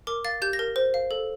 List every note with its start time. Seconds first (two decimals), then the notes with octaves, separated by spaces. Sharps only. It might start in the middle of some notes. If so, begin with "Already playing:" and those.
0.07 A#4 D6
0.25 F5 A6
0.42 G4 G6
0.53 A#6
0.59 A#4
0.76 C5
0.94 F5
1.11 A4